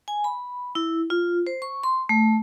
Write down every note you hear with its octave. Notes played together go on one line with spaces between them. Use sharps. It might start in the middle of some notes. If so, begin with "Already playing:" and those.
G#5
B5
E4
F4
C5
C#6
C6
A3